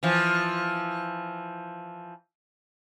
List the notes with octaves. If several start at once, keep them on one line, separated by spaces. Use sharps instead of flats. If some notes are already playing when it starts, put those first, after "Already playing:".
E3 F3